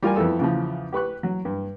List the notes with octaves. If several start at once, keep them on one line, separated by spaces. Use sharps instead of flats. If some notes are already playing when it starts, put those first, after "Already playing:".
G3 F4 A#4 G#5
F2 B3 E4 A4 E6
E2 C#3 F3
G4 B4 C#6 F#6
F#3
G2